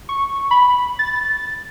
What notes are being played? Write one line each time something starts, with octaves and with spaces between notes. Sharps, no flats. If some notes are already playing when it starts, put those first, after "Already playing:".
C#6
B5
A6